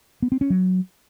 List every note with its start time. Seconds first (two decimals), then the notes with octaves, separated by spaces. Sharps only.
0.22 B3
0.32 C4
0.41 C#4
0.50 F#3